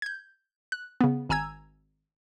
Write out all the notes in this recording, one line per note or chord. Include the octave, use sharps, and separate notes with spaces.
G6 G#6
F#6
C#3 B3
G#1 G#5 A#5 E6 G#6